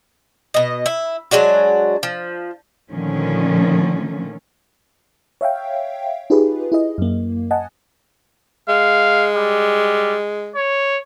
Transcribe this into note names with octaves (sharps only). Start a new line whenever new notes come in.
B2 D#5
E4
F#3 G#3 D4 F#4
F3
A#2 D3 D#3 F3 A3 C#4
C#5 E5 F5 G5
D#4 F4 G4 G#4 B4
E4 G#4 D#5
F#2 A#3
D#5 F#5 G#5 A5
G#3 F5
G3
C#5